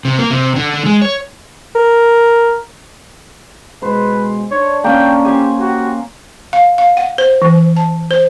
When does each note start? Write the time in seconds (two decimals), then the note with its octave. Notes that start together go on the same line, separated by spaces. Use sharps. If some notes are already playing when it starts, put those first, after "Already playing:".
0.05 C3
0.19 A#3
0.30 C3
0.56 D3
0.74 D3
0.86 G#3
1.02 C#5
1.75 A#4
3.82 B2 G#3 B4 C5
4.51 D4 C#5
4.84 A#3 C#4 G5
5.25 G4 C5 G#5
5.60 F#4 G4
6.53 F5
6.78 F5
6.97 F#5
7.18 C5
7.42 E3
7.77 A5
8.11 C5